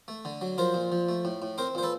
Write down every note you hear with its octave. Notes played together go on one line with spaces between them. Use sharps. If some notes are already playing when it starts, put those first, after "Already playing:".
A3
D3
F#3
F3 A#4 C5
A#2
F3
A3
A2
A2
C4 A#4 C5
A#2 C5
A4 B4